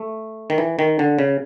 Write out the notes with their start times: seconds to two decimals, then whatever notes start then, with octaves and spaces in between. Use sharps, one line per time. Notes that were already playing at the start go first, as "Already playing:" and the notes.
Already playing: A3
0.50 D#3
0.58 E3
0.79 D#3
0.99 D3
1.19 C#3